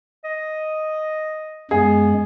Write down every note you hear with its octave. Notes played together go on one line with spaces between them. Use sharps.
D#5
F#2 G#3 B3 G#4